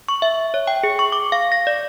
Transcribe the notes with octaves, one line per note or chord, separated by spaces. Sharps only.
C#6
E5
C#5
G5
G#4
C#6
D6
F5
A#6
D5